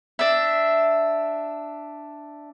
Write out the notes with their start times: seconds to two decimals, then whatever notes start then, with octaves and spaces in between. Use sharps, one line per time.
0.19 D4 E5